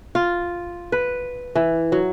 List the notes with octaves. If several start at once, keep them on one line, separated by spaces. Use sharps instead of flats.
F4
B4
E3
F#3